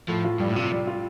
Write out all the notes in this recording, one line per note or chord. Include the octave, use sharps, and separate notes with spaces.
A2 F3
F4
G2 G3
A2
C3 F4
G3
F4